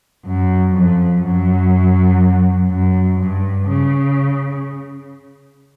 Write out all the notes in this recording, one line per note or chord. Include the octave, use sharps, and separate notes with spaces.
F#2
F2
F#2
F#2
G2
C#3